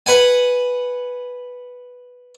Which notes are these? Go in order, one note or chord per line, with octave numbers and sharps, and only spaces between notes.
B4 F#5 G#5